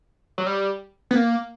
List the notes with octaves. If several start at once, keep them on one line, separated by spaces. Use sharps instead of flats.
F#3
G3
B3
A#3